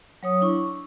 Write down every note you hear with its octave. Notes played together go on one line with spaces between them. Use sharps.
F#3 C#5 D#6
D4 E4 C#6